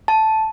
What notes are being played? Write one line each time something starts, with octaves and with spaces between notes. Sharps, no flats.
A5